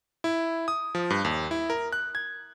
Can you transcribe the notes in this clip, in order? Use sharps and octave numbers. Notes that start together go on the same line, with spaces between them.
E4
D#6
F3
G2
D#2
E4
A#4
F#6
G#6